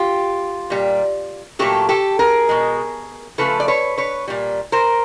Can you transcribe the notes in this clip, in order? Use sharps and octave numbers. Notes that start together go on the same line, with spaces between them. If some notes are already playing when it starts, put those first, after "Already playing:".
Already playing: F4 G4
A#2 G3
A#2 F#3 A3 G4 A4
G4 A4
G#4 A#4
B2 G#3
C#3 F3 A3 A4 B4
D5
B4 C#5
B4 C#5
A#2 G3
A#4 C5